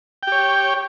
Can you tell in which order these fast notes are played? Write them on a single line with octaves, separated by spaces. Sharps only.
G5 G4 C#5